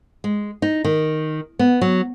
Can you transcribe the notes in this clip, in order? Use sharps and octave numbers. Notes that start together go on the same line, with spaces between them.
G#3
D#4
D#3
B3
F#3